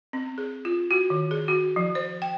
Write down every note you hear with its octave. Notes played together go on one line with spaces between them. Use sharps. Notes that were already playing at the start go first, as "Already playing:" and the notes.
C4
G#4
F4
F#4
D#3
G#4
F#4
F3
C5
G5